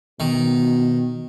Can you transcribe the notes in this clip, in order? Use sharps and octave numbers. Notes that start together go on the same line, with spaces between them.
B2 D#3